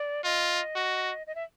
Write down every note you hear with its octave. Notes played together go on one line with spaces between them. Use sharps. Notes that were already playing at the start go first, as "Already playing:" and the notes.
Already playing: D5
F4 D#5
F#4
D#5
E5